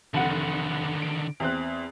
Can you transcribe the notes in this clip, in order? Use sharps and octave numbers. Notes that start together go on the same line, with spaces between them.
F1 D3 D#3 F#5
D7
E2 C4 F#6